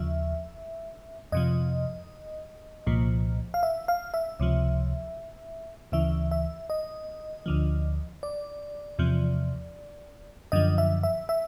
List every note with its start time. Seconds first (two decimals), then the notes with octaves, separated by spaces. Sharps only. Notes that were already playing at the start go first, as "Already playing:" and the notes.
Already playing: D#2 C#3 F3 E5
1.32 F2 C3 F3 D#5
2.87 C2 A#2 F3
3.54 F5
3.63 E5
3.88 F5
4.14 E5
4.40 C#2 C3 F3
5.92 D2 C#3 E3 E5
6.31 E5
6.70 D#5
7.46 D2 D3 F3
8.23 D5
8.99 E2 C3 F3
10.52 F#2 D3 F3 D#5
10.78 E5
11.03 E5
11.29 E5